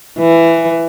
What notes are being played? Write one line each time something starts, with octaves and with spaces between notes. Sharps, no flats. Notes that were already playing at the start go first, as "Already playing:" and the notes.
E3